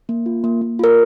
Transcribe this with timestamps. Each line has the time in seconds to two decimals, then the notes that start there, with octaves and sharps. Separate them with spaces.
0.09 A#3
0.26 F4
0.44 A#3
0.61 A#3
0.79 F4 A#4